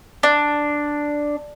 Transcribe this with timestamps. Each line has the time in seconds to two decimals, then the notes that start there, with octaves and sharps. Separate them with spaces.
0.23 D4